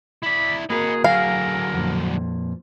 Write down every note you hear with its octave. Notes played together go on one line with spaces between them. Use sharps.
E4 D5 B5
A#3 F#4 G#4 A#4 D#5 B5
D3 F#3 G#4 A#4 F5
F2 A#2